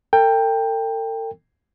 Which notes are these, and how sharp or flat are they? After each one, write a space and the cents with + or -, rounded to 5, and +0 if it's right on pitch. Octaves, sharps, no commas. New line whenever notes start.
A4 +45 G5 +15